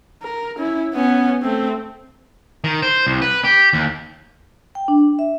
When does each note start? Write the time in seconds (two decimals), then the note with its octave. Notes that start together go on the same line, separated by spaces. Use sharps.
0.22 A#4
0.57 C#4 E4
0.94 B3 C#4
1.42 A3 C4
2.64 D#3
2.82 C5
3.07 C2
3.22 B4
3.44 G4
3.73 D#2
4.75 G5
4.88 D4
5.19 E5